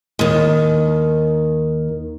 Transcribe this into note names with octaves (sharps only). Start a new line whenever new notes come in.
D#2 D#3